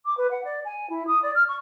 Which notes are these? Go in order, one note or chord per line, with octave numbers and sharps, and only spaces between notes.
D6
B4
F#5
D5
G#5
E4
D#6
D5
F6
C#6